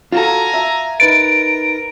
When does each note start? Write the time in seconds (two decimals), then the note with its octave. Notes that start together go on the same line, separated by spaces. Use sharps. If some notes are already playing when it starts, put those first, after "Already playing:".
0.12 F4 F#4 A4 F5 G#5 A#5
0.54 E5
1.00 D#4 A#4 B4 A6 D7